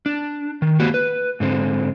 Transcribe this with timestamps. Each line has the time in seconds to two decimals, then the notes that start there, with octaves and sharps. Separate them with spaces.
0.06 D4
0.62 D#3
0.79 A#3 F#4 G4
0.94 B4
1.40 G#2 D3 C4